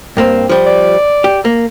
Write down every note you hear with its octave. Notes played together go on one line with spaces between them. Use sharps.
G2 A#3 C4
F3 G3
D5
G4
A#3